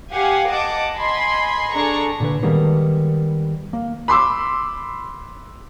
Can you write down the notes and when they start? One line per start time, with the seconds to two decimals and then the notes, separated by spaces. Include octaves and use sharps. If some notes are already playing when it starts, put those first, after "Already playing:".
0.13 G4 F5 F#5 G#5
0.50 D#5 F#5 A5 D6
0.96 D#5 G#5 B5 C6
1.74 D4 G#4 A4 A#5 C#6
2.20 A#2 D3 B4
2.43 D#3 G3 G#3 A#3 B3 D#4
3.73 A#3
4.08 B5 C6 D6 E6